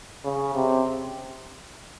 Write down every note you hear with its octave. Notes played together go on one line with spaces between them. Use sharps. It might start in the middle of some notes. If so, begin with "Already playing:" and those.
C#3
C3